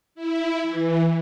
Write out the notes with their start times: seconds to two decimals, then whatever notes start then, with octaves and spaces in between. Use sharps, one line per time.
0.15 E4
0.64 E3